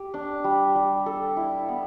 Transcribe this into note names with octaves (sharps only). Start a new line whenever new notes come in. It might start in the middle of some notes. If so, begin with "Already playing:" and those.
Already playing: G4
D4
G3
G3
A4
E4
B3